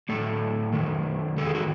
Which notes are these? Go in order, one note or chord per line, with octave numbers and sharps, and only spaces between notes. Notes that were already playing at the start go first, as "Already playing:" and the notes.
A2 F#3 A3 A4
D#3 F#3 A3
D#3 G#3 A4
G#4
F#4